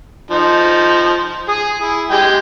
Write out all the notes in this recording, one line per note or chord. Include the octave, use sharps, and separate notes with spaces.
F3 D#4
G#4 D#6
E4
G#3 G4 G5